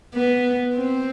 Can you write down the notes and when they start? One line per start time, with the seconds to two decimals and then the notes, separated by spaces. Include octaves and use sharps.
0.14 B3
0.75 C4